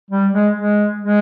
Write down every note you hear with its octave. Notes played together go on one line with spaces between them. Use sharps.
G3
G#3
G#3
G#3